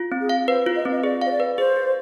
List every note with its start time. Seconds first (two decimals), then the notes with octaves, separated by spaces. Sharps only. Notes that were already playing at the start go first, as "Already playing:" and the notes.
Already playing: F4
0.12 C4
0.21 G#4
0.29 F5
0.48 B4 C5
0.66 F4
0.76 D#5
0.85 C4
0.92 D#5
1.03 G#4 D5
1.21 C5 F5
1.31 D5
1.40 B4
1.58 G#4 C5
1.76 G#4